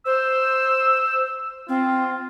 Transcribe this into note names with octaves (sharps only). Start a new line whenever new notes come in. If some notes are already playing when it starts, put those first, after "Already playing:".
C5 E6
C4 F4